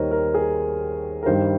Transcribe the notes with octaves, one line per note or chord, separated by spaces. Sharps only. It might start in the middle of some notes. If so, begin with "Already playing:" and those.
Already playing: D#2 D#3 G3 A#4 C5 C#5 D#5
A#4
G#4
A#4
G2 D#3 G3 C5